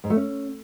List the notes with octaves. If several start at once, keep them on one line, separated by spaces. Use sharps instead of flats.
G#2
A3
C#4